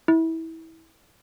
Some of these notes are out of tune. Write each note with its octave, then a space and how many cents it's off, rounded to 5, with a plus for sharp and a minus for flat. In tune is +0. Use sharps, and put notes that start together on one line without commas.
E4 -25